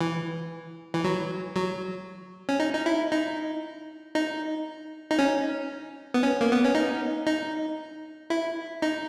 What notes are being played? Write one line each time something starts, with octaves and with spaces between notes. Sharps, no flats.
E3
E3
F#3
F#3
C#4
D#4
D#4
E4
D#4
D#4
D#4
C#4
B3
C#4
A#3
B3
C#4
D#4
D#4
E4
D#4